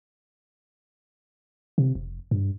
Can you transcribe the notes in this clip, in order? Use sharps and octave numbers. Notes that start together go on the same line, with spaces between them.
C3
F1
G2